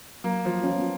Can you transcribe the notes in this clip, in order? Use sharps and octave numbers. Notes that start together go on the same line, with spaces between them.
F#3 A#3
F3
F3 C#4
B3